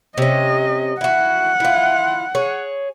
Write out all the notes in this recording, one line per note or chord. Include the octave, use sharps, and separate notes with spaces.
C3 C#4 D#5
E4 F#4 F#5
E4 F4
G#4 C#5